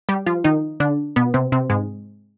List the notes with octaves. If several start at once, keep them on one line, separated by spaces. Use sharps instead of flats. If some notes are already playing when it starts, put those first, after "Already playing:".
G3 G4
F3 F4
D#3 D#4
D3 D4
B2 B3
C3 C4
C3 C4
G#2 G#3